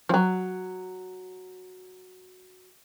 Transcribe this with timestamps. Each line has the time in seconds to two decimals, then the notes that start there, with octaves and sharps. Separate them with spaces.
0.09 F3 F#3